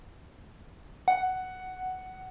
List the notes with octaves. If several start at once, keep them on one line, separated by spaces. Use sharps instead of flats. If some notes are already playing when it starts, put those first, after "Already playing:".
F#5